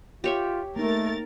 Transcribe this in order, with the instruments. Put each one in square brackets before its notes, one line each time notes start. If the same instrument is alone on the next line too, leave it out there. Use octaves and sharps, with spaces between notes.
[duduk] F4 [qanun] G4 C#5 E5
[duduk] A3 [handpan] A#3 D#4 [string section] A#4 A6